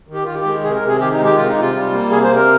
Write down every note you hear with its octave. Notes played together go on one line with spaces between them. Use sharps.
D#3
G4
D#3 F4
G4
G#3
C3 G#4
A#4
C3
G#4
D#3 G4
D#4
G#3
G4
C3 F4
D#4
C3 F4
G3
A#3
C3 G#4
C5
C3
A#4